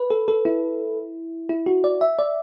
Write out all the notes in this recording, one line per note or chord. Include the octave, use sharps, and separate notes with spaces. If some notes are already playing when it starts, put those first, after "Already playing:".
Already playing: B4
A4
A4
E4
E4
F#4
D5
E5
D5